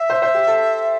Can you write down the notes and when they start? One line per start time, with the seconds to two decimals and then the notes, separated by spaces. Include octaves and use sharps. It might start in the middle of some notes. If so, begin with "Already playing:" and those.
Already playing: E5
0.10 C5
0.22 C5
0.35 G4
0.47 A4